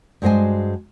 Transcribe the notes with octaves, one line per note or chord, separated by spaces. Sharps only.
G2 G#3 F#4 C5 D#5 G#5